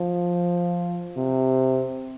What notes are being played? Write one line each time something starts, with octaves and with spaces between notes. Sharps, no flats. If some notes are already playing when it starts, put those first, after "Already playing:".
Already playing: F3
C3